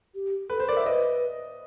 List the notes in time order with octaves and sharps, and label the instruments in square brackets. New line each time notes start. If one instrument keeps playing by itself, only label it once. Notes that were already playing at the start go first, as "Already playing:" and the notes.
[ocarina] G4
[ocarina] A4 [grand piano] B4
[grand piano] C5
[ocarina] A#4 [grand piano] D5
[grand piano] E5
[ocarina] B4 [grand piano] D#5